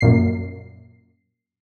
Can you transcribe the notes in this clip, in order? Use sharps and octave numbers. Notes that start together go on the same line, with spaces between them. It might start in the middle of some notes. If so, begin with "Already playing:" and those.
F#2 A#2 C7